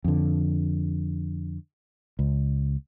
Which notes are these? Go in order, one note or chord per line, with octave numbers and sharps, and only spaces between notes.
F2 D3
C#2